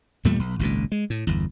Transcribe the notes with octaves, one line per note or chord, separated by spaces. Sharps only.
E2 A#2 G3 A3
B1
G#1 C#2 A#2
G#3
A2
G1 E2